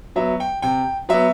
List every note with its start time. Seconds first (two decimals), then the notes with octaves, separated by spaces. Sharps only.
0.16 F#3 B3 E5
0.40 G5
0.62 C3 G5
1.09 F#3 B3 E5